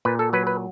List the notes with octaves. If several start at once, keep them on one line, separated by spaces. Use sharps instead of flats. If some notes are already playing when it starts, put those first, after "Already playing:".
A#2 B4
A4
F#3 B4
B4